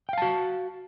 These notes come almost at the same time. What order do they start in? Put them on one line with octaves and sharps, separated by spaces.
G5 F5 A5 F#4